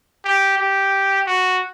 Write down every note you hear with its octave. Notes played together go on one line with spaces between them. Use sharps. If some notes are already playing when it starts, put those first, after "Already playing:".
G4
G4
F#4